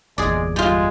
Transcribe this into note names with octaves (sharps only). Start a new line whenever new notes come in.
G1 E2 A#2 G#3 G#4 D5
G3 G#3 F4